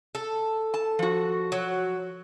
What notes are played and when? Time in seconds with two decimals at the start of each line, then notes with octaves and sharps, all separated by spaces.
0.15 A4
0.74 A5
0.99 F3 F#4
1.52 F#3